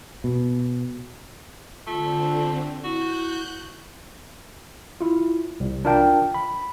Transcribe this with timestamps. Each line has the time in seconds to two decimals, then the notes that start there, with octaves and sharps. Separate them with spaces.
0.24 B2
1.87 D3 A3 C4 F4
2.84 E4 F#4 F#6 G6
5.01 E4 F4
5.60 C2
5.85 D4 F4 A#4 F5 G5 A5
6.34 B5